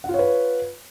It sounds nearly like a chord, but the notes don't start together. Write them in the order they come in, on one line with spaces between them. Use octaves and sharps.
F#5 F4 C#5 B4